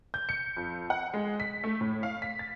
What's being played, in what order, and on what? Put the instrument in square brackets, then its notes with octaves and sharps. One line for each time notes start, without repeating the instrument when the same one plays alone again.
[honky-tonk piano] G6
C#7
F2
F#5
G#3
B6
A3
A2
F5
B6
A6